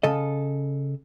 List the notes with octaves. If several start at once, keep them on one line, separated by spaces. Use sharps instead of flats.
C#3 A4 D#5